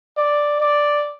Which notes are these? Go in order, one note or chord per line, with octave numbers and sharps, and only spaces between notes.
D5
D5